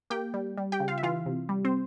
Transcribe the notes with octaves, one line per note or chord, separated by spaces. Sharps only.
A#3 G4 G5
G3
G3
G4 G5
C#3
F4 F5
E5
E3 F4 F5
C3
G3
C4 C5